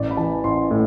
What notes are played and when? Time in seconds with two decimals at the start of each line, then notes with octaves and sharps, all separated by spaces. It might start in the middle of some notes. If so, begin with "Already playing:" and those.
Already playing: A1 D5
0.11 B5
0.17 E3 A5
0.44 A1 C6
0.71 A2